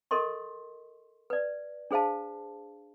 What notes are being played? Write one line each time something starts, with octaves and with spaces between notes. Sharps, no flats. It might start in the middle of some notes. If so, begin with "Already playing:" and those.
A4 A#4 D#5 C6 C#6
B4 D5
D4 G#4 C5 F5 A5